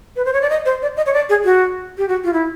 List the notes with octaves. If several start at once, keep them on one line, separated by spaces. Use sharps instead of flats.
B4
C5
C#5
D5
D#5
C5
D5
D#5
C#5
D5
G#4
F#4
G4
F#4
F4
E4